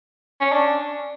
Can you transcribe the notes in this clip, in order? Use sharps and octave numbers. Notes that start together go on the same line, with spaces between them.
C#4
D4